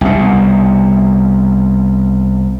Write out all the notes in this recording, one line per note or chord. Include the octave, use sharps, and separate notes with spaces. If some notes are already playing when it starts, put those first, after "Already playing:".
C2 B2